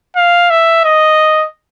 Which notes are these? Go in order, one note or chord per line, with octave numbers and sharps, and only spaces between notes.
F5
E5
D#5